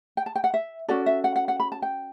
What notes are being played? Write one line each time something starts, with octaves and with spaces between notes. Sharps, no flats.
G5
A5
G5
F#5
E5
C#4 F#4 A4 D5
E5
F#5
F#5
F#5
B5
A5
G5